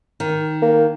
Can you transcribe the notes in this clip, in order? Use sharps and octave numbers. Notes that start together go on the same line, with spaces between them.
D#3
A#3